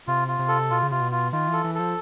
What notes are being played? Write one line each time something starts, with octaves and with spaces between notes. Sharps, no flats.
C3 F4
F4
C3
A4
B2 F4
C#3
C3 F4
B2
F4
D#3 F4
E3 A4
E3
F3 A4